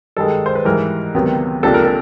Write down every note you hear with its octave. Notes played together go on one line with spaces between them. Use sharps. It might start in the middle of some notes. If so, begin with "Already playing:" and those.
G2 D#3 G#3 A4
C5
B4
G#2 E3 G3 A#4
C#2 C3 D#3 F#3 B3
C#2 C3 F3 A#3 D4 A4
A#4
A4